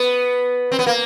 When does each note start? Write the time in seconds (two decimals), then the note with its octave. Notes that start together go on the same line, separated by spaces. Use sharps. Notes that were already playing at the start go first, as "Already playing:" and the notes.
Already playing: B3
0.72 C4
0.79 B3
0.87 A#3